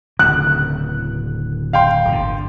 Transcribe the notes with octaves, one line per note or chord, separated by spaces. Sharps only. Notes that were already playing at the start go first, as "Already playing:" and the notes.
D1 C#3 F#6
F5 G5 C6
G1 D3